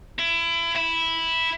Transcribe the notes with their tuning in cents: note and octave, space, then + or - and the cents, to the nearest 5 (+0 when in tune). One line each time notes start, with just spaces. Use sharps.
E4 +25
E4 -5